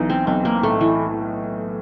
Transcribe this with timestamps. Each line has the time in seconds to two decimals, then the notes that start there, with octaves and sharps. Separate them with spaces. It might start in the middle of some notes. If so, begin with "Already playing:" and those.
Already playing: B1 E3 D#4
0.10 C4
0.27 B1 C4
0.45 A#3
0.63 A2 A3
0.81 E3